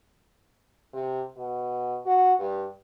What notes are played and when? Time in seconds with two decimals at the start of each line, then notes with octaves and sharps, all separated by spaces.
0.94 C3
1.37 B2
2.06 F#4
2.39 G2